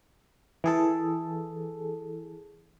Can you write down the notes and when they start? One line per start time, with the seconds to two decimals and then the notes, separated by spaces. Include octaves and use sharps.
0.64 E3 G#4 A4